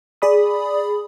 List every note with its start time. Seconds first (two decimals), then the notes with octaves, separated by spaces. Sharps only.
0.22 G#4 D5 B5 D#6